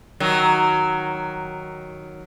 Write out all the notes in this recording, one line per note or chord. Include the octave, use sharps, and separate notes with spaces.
D#3 F#3